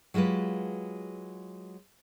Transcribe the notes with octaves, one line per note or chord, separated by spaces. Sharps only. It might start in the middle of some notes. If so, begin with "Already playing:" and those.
F#3 G#3 F4 G4 B4